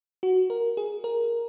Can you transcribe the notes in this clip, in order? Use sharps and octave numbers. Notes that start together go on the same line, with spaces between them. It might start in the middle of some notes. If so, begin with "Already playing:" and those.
F#4
A#4
G#4
A#4